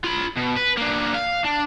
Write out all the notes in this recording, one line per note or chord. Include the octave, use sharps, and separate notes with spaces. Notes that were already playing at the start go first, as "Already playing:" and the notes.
F4 B5
B2
B4
A#3 D4
F5
D4